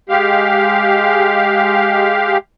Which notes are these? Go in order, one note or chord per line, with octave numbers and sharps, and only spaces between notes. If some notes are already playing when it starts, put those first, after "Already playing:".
G#3 G4 F5